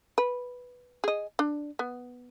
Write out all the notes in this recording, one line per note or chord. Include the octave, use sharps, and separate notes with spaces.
B4
G#4 D#5
D4
B3